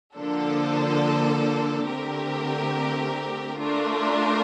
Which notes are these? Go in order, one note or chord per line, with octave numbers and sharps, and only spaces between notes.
D3 F3 A#3 D4 A4
D3 A3 C4 G4 A#4
A3 D4 F4 A#4